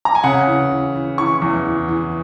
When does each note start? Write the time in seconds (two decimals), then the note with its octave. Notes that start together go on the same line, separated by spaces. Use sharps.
0.05 A#5
0.15 G#5
0.24 C#3 F#5
0.47 E3
0.71 E3
0.95 E3
1.18 E3 C#6
1.42 E2
1.65 E3
1.89 E3